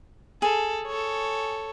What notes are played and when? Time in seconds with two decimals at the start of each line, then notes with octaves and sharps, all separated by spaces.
0.42 G#4 A4
0.86 A4 C#5